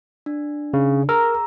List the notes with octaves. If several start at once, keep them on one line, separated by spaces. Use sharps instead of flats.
D4
C#3
G#4 A#4 A#5 E6